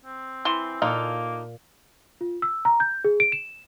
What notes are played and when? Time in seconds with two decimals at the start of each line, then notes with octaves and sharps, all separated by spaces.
0.05 C4
0.45 E3 C6
0.82 A#2 A#3 D#4 F4 A4
2.21 F4
2.42 E6
2.65 A#5
2.80 G6
3.04 G#4
3.20 D7
3.32 E7